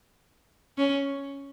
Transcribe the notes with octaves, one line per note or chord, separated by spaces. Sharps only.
C#4